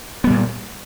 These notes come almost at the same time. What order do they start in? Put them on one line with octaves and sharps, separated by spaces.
B3 G3 A#2